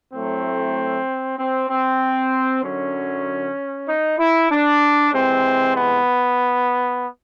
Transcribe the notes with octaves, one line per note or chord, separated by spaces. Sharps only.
A2 F#3 A3 C4
C4
C4
F#2 D3 F#3 C#4
D#4
E4
D4
C3 E3 G#3 C4
B3